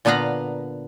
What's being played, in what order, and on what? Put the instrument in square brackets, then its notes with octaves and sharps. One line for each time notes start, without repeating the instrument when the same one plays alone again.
[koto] A#2 D3 B3 B4 F5 A#5